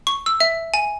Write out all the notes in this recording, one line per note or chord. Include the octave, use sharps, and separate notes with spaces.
C#6
E6
E5
G#5